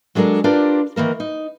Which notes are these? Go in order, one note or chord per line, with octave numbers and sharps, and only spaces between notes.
F#3 G#3 D4 A4 A#4
D4 F4 G4 A#4 B4 D5
D#3 E3 A#3 A#4
D#4